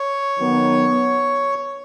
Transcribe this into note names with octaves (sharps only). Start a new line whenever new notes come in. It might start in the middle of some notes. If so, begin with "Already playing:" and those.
Already playing: C#5
D#3 F#3 B3